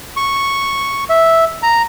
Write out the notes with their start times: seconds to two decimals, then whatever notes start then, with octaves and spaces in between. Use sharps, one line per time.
0.17 C#6
1.10 E5
1.63 A#5